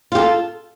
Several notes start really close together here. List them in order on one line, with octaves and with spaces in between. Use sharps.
F4 G4 A4